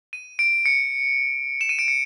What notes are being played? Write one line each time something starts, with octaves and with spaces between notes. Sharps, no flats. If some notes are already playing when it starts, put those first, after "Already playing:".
D#7
D7
C#7
E7
D#7
D7
C#7